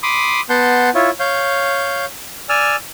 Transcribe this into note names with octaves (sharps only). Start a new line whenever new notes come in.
B5 C6 D6 D#6
B3 F#5 A5 C6 G6
E4 F4 C#5
C#5 F5 G6
D5 G#5 E6 F6